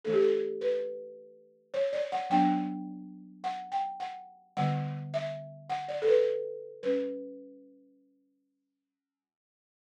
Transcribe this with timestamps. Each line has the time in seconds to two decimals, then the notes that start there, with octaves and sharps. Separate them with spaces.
0.05 E3 A3 D4 A4
0.13 G4
0.22 A4
0.61 B4
1.74 C#5
1.93 D5
2.12 F#5
2.30 F#3 B3 D4 G5
3.44 F#5
3.72 G5
4.00 F#5
4.57 D3 G3 B3 F#5
5.14 E5
5.70 F#5
5.88 D5
6.02 A4
6.08 B4
6.83 G3 C#4 B4